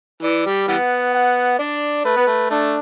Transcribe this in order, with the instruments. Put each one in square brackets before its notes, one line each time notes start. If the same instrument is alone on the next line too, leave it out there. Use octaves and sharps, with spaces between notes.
[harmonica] E3 [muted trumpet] D5
[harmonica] G3
[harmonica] E3 G3 B3 [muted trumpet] F#5
[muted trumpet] F#5
[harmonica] D4 [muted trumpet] D5
[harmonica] A3 [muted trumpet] B4
[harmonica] B3
A3
[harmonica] A3 [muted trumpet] D4